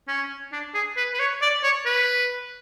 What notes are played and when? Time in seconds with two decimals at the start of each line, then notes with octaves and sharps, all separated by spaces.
0.08 C#4
0.52 D4
0.74 G#4
0.97 B4
1.14 B4
1.19 C#5
1.42 D5
1.63 C#5
1.86 B4